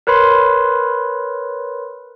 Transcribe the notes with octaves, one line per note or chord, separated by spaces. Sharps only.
A#4 B4 C#5 B5 C6